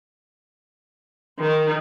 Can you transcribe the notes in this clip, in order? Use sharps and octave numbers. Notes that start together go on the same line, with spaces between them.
D#3